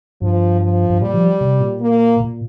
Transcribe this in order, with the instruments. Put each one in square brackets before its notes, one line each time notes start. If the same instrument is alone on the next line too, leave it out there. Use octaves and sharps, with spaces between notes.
[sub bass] G2 [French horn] F3
[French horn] F3
[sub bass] G2
[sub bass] A#2 [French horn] G3
[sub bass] F3
C3
A#2
[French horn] A#3
[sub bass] A#2